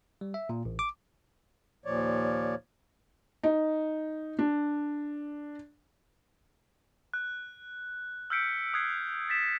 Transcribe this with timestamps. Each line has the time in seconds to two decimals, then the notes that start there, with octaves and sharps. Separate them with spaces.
0.21 G3
0.34 E5
0.49 A#2
0.65 A1
0.79 D6
1.85 D#2 A#2 F3 C#5 D5
3.43 D#4
4.39 D4
7.14 F#6
8.30 E6 F6 G6 B6 C#7 D7
8.74 D#6 F#6 G#6 C7
9.29 A6 B6 E7